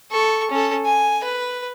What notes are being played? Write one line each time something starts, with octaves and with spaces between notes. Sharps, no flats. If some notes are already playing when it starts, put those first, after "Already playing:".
A4 C#6
C#4 A4
G#5
B4